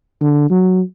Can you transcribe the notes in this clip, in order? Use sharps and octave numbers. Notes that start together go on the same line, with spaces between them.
D3
F#3